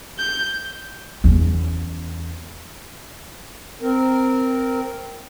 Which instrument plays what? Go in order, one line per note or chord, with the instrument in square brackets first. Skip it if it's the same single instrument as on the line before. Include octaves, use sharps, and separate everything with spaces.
[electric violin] G6
[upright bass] E2 C#4
[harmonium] C4 A#4